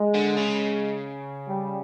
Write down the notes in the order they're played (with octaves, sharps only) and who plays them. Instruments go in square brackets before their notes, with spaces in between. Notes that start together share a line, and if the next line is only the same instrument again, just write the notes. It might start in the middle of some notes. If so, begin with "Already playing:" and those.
Already playing: [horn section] G#3
[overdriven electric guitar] D3
C#3
[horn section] G3